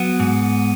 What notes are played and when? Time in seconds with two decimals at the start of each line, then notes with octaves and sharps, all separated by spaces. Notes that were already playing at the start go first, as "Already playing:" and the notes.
Already playing: F#3 B3
0.20 G#2